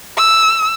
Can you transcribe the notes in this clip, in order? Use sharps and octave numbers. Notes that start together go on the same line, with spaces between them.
E6